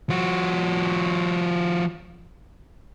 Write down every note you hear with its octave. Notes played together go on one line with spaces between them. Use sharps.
F3 F#4